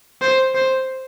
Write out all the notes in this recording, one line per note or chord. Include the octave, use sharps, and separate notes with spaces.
C5
C5